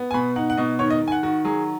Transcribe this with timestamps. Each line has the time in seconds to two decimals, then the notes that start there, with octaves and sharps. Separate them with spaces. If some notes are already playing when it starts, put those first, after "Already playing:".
Already playing: B3
0.11 G#5
0.14 B2 B5
0.36 D#4 F#5
0.50 F#5
0.57 B2 D#5
0.79 D#3 C#5
0.90 D#5
1.01 D#3
1.08 G#5
1.12 F#5
1.23 D#3 F#4
1.45 F#3 G#4